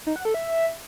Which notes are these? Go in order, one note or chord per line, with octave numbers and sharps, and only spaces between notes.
D#4
F#5
A4
E5